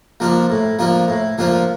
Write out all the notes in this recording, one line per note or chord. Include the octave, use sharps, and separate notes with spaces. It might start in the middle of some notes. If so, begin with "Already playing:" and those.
F3 A#3 D4 F4
A2
F3 A#3 D4 F4
A2
F3 A#3 D4 F4